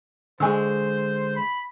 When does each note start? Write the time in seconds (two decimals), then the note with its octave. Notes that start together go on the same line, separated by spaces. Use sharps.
0.40 D3 G#3 C5 G#5 C#6 E6
1.36 B5